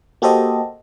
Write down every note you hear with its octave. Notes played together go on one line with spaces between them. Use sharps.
A#3 F#4 G4 A4 C5 D#5